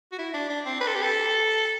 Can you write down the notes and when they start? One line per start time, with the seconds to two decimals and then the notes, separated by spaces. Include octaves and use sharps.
0.12 F#4
0.19 E4
0.34 D4
0.50 D4
0.65 C4
0.81 B4
0.87 A4
0.95 G4
1.03 A4